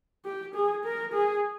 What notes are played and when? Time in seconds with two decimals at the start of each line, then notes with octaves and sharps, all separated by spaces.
0.25 G4
0.55 G#4
0.85 A#4
1.13 G#4